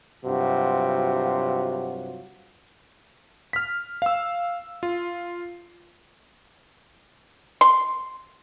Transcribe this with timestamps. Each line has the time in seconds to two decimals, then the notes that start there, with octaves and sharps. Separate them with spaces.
0.25 G2 C3 F#3 F4 F#4
3.53 F6 B6
4.02 F5 E6
4.83 F4
7.61 C6